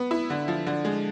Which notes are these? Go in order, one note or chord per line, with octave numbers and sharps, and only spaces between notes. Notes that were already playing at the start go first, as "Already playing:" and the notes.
Already playing: B3
E4
D3
F3
D3
G#3